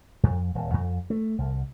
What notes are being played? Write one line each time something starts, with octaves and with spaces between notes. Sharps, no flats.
F2
D#1
F2
A3
C2